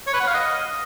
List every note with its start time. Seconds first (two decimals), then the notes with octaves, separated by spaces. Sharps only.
0.07 C#5
0.14 B4
0.20 F#5
0.27 F5
0.34 D#5